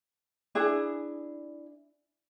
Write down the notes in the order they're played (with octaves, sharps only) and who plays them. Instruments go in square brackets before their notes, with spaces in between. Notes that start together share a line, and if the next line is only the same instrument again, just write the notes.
[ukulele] D4 E4 G#4